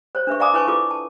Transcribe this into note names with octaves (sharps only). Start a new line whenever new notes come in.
C5 C#5
D4 B4 E5 C#6
D5 F5 G#5 A#5 D6 D#6
E4 B4 C#5 G#5 A5 C#6
E4 F4 A4 B4 D6
A5